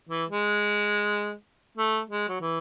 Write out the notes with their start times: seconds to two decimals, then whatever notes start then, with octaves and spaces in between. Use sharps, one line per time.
0.09 E3
0.30 G#3
1.78 A3
2.09 G#3
2.29 F#3
2.41 E3